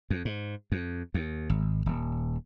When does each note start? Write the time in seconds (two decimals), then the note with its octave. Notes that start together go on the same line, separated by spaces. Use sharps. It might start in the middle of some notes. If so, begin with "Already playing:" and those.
0.10 F2
0.25 G#2
0.72 F2
1.14 D#2
1.50 G#1
1.86 D#1